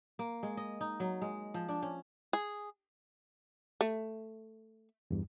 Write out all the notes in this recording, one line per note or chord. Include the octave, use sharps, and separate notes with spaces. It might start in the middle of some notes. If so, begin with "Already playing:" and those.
A#3
G#3
D#5
D#4
F#3
G#3
F3
D4
C#4
G#4
A3
E2 G2